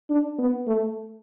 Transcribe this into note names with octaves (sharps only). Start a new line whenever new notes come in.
D4
B3
A3